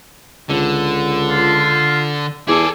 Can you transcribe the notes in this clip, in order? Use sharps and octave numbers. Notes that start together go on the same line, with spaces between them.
C#2 D3
F4
E2 G#4 A4 D6